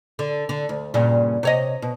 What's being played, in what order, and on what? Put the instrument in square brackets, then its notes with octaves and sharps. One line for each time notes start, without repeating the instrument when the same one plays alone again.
[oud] D3
D3
D2
G2 A#2 C#3
C3 C#5 D#5
B2